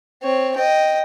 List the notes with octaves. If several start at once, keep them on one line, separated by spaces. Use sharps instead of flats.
C4 C#5
D#5 G5